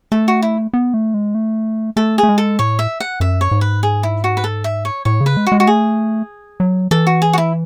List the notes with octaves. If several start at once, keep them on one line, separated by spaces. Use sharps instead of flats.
A3 A4
F#4
E4
B3
A3
G#3
A3
A3 A4
G#4
A3
G#3
A4
A2 C#5
E5
F#5
F#2 E5
C#5
G#2
B4
G#4
E4
F#4
B4
A4
E5
C#5
A2 C#5
C#3
B4
G#3
F#4
G#3
F#4
A3 G#4
F#3
E3 A4
F#4
G#4
F#4
E4